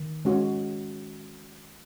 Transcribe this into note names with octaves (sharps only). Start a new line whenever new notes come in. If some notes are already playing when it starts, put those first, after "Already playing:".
Already playing: D#3
G#3 C#4 F#4